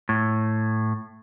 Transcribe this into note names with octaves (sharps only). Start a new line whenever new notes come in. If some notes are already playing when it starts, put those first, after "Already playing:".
A2